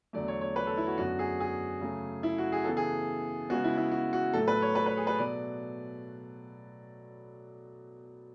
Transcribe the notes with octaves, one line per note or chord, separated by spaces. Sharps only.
E2 D3 F#3 A3 D5
C#5
C#5
B4
A4
E4
F#4
F#2 D3 F#3 B3 F#4
G#4
G#4
C#3 F#3 A3
E4
F#4
G#4
C#3 E3 B3 A4
G#4
C#3 G#3 B3 F#4
E4
E4
F#4
F#4
A2 F#3 A3 A4
B4
C#5
B4
B4
G#4
B4
B2 F#3 A3 D5